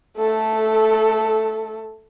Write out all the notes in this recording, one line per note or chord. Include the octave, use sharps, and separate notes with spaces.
A3 A4